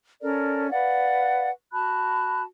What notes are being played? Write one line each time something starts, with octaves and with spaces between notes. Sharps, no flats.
C#4 A4 A#4 D5
B4 D5 F5 F#5
F#4 A5 B5 F#6